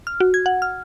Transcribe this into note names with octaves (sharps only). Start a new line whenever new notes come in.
F6
F#4
G#6
F#5
F6